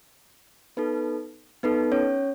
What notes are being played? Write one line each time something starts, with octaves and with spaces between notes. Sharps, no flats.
B3 D#4 A4 B4
B3 D#4 A4 B4
C#4 C#5